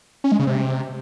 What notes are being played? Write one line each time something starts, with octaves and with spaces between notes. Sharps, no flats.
C#4
G#3
C#3
C3